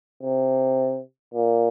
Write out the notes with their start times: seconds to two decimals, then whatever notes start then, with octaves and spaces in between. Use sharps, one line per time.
0.23 C3
1.34 A#2